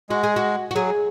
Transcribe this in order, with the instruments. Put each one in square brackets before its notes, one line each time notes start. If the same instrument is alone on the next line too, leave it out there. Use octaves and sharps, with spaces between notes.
[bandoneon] G#3 [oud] F#4
[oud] G#4
F#4
F#4
[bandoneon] F#3 [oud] G#4